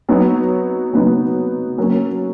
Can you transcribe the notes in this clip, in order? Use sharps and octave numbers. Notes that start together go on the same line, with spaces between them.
F#3 B3 D#4
F#3 B3 D#4
F#3 A#3 C#4